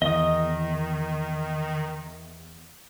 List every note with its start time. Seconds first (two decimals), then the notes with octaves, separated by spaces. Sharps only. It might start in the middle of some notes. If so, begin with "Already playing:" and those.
0.02 E2 D#3 D#5 D#6